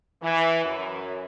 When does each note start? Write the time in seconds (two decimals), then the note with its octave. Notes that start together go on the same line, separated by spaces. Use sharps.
0.22 E3
0.65 F#2